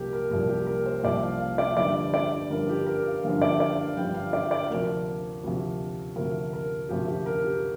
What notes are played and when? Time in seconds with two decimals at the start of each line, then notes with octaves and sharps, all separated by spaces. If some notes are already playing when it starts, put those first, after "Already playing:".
Already playing: C2 A#2 F3 G4 A#4
0.13 A#4
0.31 C2 A#2 F3 A#4
0.49 G4
0.67 A#4
0.86 C5
1.03 C2 A#2 F3 D5
1.23 F5
1.40 F5
1.58 D5
1.77 G1 G2 D3 F3 D5
2.14 D5
2.50 G1 G2 D3 F3 A#4
2.69 G4
2.86 A#4
3.06 F5
3.23 G1 G2 D3 F3 F5
3.42 D5
3.60 D5
3.78 F5
3.97 G1 G2 D3 F3 G5
4.15 F5
4.33 D5
4.51 D5
4.69 D2 C3 F3 A#4
5.43 D2 C3 F3
6.16 D2 C3 F3 A#4
6.53 A#4
6.89 D2 C3 F3 G4
7.08 G4
7.26 A#4
7.44 G4